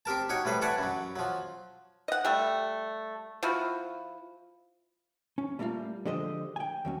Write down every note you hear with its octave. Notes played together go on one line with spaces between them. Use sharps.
C4 G4 A#4 A5
D#4 F#4 C#5
A2 G3 B4 C5
B4 C#5 D5 F#5 G#5 A5
F#2 F#3
F3 F#3
D#5 F#5
G3 A3
F3 E4 F#4
C#4
G3 A3 A#3 D4 F4
D3 F3 G#3 G4 C5 D#5
G5 G#5
D#2 F#3 C#4